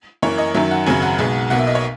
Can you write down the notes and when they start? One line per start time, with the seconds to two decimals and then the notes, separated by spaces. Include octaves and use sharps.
0.22 F#2 E3 A#3 C#5
0.38 D#5
0.55 F#2 D#3 F#3 E5
0.71 F#5
0.87 G#1 F#2 C#3 F#3 G#5
1.02 F#5
1.19 B1 B2 G#3
1.50 B1 B2 A#3 F#5
1.58 E5
1.67 D#5
1.75 C#5